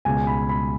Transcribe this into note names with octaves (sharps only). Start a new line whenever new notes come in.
C#2 B2 G#3 G#5
B5
B5